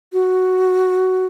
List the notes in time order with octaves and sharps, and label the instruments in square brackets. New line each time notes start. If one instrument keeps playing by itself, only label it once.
[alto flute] F#4